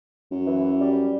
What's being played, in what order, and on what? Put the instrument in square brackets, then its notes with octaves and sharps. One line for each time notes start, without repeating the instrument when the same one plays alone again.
[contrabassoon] F#2
[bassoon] E3
G3